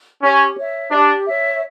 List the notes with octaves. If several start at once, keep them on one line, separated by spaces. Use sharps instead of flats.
C#4 G4
C#5 E5
D4 G4
C#5 E5